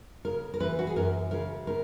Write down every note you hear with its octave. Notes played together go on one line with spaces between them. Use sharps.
C#3 A#4
A#4
E3 B4
F#4
G#4
F#2 A#4
C#3 A#4
B3 A#4